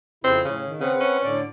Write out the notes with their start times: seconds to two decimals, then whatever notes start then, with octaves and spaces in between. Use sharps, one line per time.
0.24 F2 C#3 C4 E4
0.45 A2 C#3
0.66 D#3
0.81 C#3 C4 B4 F#5
1.00 C#4
1.23 A2 D3 D5